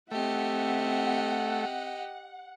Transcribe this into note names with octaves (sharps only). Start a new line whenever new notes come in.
A3 C4 G4 D#5 E5 F#5